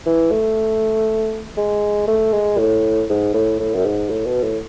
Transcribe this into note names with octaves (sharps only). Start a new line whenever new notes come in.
E3
A3
G#3
A3
G#3
A2
G#2
A2
A2
F#2
G#2
A2
B2
A2